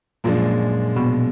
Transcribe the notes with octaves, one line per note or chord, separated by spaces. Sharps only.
F#2 A#2 F3 G#3 D4
B2